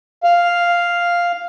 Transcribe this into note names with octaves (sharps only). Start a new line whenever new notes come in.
F5